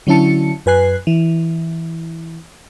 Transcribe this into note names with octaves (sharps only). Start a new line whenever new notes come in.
D3 F#3 C#4 E4 A5 C#7
F#2 B4 G#5 F#6 C7
E3